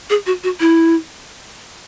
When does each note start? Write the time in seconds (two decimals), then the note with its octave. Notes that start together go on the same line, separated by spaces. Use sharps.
0.10 G#4
0.26 F#4
0.44 F#4
0.60 E4